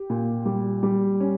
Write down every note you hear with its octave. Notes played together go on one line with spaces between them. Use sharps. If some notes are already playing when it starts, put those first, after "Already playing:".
Already playing: G4
A#2
G3
G3
C#4